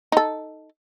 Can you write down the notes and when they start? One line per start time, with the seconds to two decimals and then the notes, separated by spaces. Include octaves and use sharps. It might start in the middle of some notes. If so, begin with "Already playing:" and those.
0.12 D#4 A4